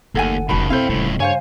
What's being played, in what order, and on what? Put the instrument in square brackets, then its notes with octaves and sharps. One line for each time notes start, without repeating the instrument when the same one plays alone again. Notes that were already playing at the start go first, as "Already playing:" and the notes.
[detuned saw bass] F#1 [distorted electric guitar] D#2 [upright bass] A3 [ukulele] A4 F#5 G#5
[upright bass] F1 G#3 [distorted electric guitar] C#2 D#3 [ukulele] F#4 A5 B5
[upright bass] B2 [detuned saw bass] C4 [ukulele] E4 A4 C5 [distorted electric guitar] F5 G5
[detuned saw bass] D1 [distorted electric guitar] C#2 A2 [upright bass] C#3 G3
[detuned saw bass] G2 [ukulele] C5 F5 G#5 [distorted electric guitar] C#5